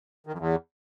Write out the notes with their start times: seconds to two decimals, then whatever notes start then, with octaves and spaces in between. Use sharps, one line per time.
0.27 D#3
0.33 F2
0.38 E2